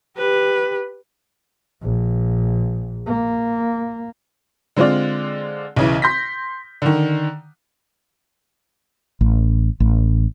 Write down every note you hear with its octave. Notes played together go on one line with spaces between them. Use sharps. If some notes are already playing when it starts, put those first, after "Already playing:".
G4 B4
A#1
A#3
D3 G#3 C4 F4 D5
B1 C#3 E3
C6 G6 A#6 B6
D3 D#3
A1
A1